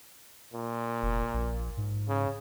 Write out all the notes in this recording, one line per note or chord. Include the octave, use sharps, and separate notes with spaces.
A#2
F1
A#1
G#2
C#3